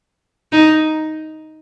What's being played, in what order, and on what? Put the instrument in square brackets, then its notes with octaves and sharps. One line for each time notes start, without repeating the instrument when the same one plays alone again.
[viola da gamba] D#4